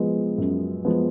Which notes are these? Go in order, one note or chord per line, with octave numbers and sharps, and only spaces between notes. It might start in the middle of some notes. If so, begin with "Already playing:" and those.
Already playing: F3 G#3 B3
F#2
F3 G#3 B3